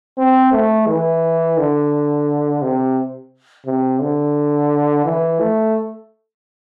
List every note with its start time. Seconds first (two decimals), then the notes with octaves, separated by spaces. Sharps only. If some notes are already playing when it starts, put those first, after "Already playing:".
0.18 C4
0.52 A3
0.87 E3
1.58 D3
2.62 C3
3.66 C3
4.01 D3
5.05 E3
5.40 A3